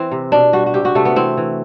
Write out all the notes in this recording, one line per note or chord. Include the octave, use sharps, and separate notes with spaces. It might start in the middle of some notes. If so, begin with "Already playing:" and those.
Already playing: E3 C4
C3
B2 D4
G3 F#4
F#4
C3 G4
F#4
C3 A3
B3
E3 C4
E3